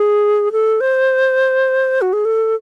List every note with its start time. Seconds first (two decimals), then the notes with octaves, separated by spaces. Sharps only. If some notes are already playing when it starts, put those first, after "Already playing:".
Already playing: G#4
0.52 A4
0.80 C5
2.01 F#4
2.13 G#4
2.25 A4